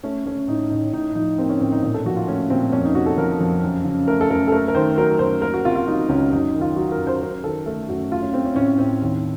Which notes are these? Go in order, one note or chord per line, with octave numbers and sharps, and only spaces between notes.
A3 C#4
A3 C#4
A2 D#4
A2 D#4
A2 D#4
F3 D#4
A#3 C4
C#4
A2 C4
D#4
A#2
A4
F3 F#4
F4
A3 C#4
A#2 C4
F2 C#4
D#4
C3 F#4
A4
F3 A#4
F2
F#2
C#3
A3 A#4
A4
F#2 A#4
A4
A3 A#4
A#4
D#3 C5
F#3 A#4
F#2 C5
A#3 A#4
F#4
C3 F4
F4
F#3 D#4
C#2 C#4
F#2 D#4
D#3
F4
F#3 F#4
A#4
F#2
C5
F#2 A#4
D#3 A4
A3 A4
F#2 F#4
A3 F4
C#4
A3 C4
C#4
A2 C#4
A2 C4
D#2